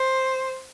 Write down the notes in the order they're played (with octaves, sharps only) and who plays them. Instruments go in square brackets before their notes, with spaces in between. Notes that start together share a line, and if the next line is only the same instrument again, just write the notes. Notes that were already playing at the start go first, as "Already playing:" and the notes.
Already playing: [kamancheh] C5